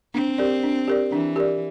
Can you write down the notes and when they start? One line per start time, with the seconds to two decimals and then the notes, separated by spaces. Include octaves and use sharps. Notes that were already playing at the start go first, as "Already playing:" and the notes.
0.14 C4 D4
0.38 G4 A#4 D5
0.63 D4
0.88 G4 A#4 D5
1.11 E3 D4
1.36 G4 A#4 D5